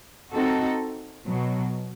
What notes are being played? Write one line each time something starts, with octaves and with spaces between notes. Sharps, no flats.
C4 D#4 F#4 A4
B2 F#3